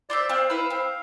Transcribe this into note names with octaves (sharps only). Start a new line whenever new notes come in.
F4 C5 D5 E5
C4 F5
E4 B4 E5
C4